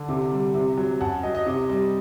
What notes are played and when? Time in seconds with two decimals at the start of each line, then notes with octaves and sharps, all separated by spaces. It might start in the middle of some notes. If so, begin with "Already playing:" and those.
Already playing: D3
0.09 C3
0.32 G3
0.54 C3
0.78 F#3
1.00 F#2 F#5 A5
1.23 F#3 D#5
1.35 D#5
1.46 C3
1.69 G3